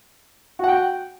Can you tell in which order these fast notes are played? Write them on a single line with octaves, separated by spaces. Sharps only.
F#4 F#5 G5